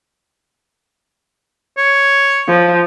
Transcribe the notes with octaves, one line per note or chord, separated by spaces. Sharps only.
C#5
F3